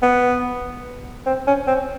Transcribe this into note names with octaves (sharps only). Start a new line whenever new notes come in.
B3
C4
C#4
C4